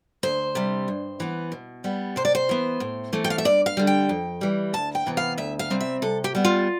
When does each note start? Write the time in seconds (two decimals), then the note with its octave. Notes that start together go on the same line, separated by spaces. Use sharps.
0.23 D2 C5
0.55 C3 G3
0.88 G2
1.20 E3 B3
1.52 B2
1.84 G3 B3
2.16 C3 C5
2.25 D5
2.35 C5
2.49 E3 B3
2.80 A2
3.13 E3 A3 C4
3.24 G5
3.30 F5
3.38 E5
3.45 G2 D5
3.66 F5
3.77 D3 G3
3.87 G5
4.09 F2
4.41 E3 G3
4.73 D2 A5
4.95 G5
5.06 C3 E3 B3
5.17 F5
5.38 D2 E5
5.59 F5
5.70 C3 G3 C4
5.81 E5
6.02 C3 A4
6.24 G4
6.35 G3 B3
6.45 F4